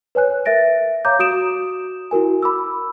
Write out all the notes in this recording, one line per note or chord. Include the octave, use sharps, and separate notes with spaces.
B4 C#5 G#5 F#6
A#4 E5 A6 A#6 D7
C#5 F5 A#5 D6 G6
F#4 D#6 D7 E7
E4 F#4 A#4 G#5
B5 D6 E6